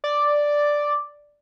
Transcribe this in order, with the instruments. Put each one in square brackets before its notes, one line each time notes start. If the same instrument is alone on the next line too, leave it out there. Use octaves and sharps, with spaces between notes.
[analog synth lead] D5